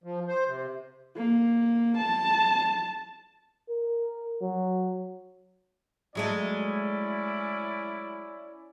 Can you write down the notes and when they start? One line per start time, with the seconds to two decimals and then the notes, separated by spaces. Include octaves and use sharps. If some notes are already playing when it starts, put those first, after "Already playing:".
0.04 F3
0.28 C5
0.47 C3
1.17 A#3
1.98 A5
3.69 A#4
4.41 F#3
6.15 F#3 G#3 A3 C#4 E4 D5